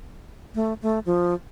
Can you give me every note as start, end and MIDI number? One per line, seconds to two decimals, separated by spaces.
0.55 0.73 57
0.82 0.99 57
1.06 1.34 53